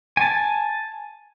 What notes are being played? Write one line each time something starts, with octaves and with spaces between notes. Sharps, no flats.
G#5 A5